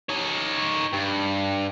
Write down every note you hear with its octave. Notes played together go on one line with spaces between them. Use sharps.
D#4 C#5
G2